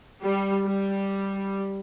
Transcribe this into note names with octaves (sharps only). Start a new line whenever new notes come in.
G3
G3